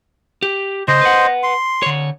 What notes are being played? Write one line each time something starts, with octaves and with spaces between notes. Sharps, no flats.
G4
C#3 C5 D#5 C6
B4 F#5
C6
D3 C#5